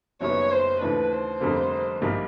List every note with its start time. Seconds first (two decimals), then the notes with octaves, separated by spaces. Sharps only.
0.21 F#1 F#2 D#3 G3 B3 C#5
0.51 C5
0.81 D#2 C#3 E3 A3 D4 B4
1.11 C5
1.40 F1 F2 D3 G3 A#3
2.01 A#1 G#2 D#3 G3 A#3